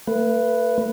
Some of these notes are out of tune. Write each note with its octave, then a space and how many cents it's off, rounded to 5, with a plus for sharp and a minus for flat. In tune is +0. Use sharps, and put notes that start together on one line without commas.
A3 +40 B4 +0